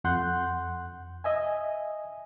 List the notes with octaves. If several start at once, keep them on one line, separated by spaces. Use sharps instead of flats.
F2 F#5 C6 F#6 G6
D#5 E5 G#5